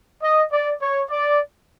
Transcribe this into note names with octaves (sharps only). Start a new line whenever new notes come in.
D#5
D5
C#5
D5